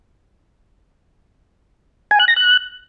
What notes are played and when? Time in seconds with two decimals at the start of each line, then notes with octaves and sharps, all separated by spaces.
2.11 G#5
2.19 F#6
2.28 A#6
2.36 F#6